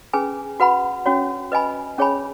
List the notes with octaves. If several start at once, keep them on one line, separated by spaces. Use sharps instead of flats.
C#4 G#4 B4 G#5
F#4 B4 F#5 B5
C#4 F#4 C#5
B4 D#5 G#5 B5
C#4 G#4 C#5 G#5 B5